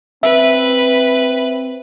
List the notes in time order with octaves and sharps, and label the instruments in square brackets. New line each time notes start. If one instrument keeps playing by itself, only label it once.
[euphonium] C4 [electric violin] B4 [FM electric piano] E5